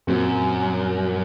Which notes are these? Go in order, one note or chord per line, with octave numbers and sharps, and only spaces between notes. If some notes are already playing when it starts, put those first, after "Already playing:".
F#2 A#2 F#3 C4 F#4